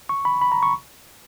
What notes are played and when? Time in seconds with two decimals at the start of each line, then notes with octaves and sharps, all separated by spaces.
0.09 C#6
0.25 B5
0.41 B5
0.52 A#5
0.63 C#6